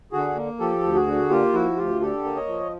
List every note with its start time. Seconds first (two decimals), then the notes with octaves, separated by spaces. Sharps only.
0.12 D3 F#4 G#4
0.36 A#3
0.60 F3 G4 A4
0.83 D2
0.94 F#4 G#4
1.07 D3
1.30 A#3 F4 G4
1.53 F3 E4 F#4
1.77 D2 F4 G4
2.01 D3 G4 A4
2.24 A#3
2.36 C#5 D#5
2.47 F3